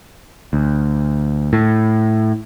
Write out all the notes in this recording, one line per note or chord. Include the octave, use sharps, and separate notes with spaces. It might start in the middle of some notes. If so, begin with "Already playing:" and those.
D2
A2